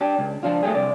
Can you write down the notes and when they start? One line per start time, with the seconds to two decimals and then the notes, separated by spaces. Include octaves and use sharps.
0.01 D4 G4
0.19 C#2
0.43 F3 D4 F4
0.63 A3 A#3 G4 G#4
0.75 C2 D5